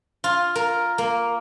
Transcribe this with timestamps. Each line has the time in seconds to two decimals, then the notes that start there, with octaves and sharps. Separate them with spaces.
0.24 F4
0.55 A#4
0.98 A#3